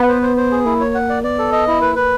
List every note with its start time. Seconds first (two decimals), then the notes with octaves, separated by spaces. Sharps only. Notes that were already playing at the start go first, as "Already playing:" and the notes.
Already playing: B3 B4
0.08 C5
0.22 C5
0.37 C5
0.51 G#4
0.65 A#3 E4
0.80 C#5
0.95 F#5
1.09 D5
1.24 B3 D5
1.38 A4
1.52 D#5
1.68 E4
1.81 A#3 B4
1.96 B4